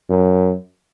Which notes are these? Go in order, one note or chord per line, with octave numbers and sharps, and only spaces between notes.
F#2